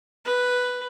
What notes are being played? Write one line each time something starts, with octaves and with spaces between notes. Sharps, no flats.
B4